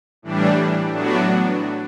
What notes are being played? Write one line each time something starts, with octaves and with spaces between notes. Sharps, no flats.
A2 E3 G3 D4
A2 F#3 B3 D4 F#4